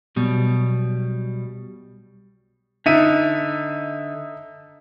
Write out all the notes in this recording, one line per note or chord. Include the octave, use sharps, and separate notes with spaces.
B1 B2 G3
D3 D#4 E5 D#7